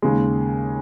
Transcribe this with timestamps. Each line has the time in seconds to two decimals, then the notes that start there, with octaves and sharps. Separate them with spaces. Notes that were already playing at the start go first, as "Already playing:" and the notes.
0.02 D#2 C#3 G#3